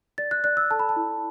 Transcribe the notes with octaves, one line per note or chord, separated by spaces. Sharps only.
D5 A6
F#6
D5 F#6
E6
A4 A5
B5
A5
E4